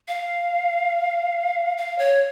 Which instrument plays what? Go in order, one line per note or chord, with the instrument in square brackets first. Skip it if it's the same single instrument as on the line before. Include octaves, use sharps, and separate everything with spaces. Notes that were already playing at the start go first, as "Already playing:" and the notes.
[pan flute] F5
F5
C#5